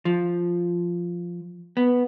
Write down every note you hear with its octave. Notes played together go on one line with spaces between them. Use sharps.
F3
B3